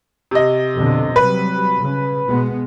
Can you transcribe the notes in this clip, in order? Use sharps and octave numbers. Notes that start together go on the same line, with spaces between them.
C3 D#5
F2 B2 D3
C3 F#3 G3 B4
C#3
B2 G#3 B3